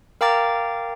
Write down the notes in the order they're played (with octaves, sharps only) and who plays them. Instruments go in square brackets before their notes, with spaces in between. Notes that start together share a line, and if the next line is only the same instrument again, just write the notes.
[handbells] A#4 F5 G5 A#5 D6 A6